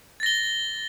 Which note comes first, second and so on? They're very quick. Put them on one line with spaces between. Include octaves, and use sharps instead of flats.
A6 A#6 G7